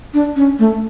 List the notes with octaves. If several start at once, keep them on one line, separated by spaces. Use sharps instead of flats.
D4
C#4
A3